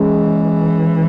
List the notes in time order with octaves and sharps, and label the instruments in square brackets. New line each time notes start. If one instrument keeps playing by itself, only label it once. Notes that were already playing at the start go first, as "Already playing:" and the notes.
Already playing: [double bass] E3 [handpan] G#3 C#4